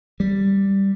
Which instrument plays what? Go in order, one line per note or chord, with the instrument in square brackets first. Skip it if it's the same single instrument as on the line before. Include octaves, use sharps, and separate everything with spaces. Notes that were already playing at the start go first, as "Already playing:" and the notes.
[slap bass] G3